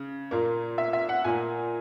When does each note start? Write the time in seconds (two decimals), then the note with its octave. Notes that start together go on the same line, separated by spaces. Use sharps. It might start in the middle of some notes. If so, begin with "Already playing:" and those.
Already playing: C#3
0.31 A#2 A#3
0.78 E5
0.93 E5
1.09 F#5
1.24 A#2 A#3 G#5